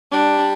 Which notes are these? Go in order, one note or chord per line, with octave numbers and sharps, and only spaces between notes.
G3 D4